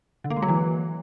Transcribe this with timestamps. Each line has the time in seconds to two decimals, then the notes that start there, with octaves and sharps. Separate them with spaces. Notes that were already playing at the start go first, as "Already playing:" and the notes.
0.24 D3
0.30 A#3
0.36 G#3
0.42 F#3
0.49 E3